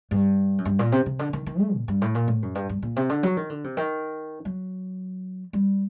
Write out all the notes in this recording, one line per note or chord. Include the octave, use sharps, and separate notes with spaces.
G2
F#2
G2
A#2
C3
C3
D3
D#3
D#3
A3
A#2
G2
A2
A#2
A2
F#2
G2
G2
A#2
C3
D3
F#3
D#3
D3
C3
D#3
F#3
G3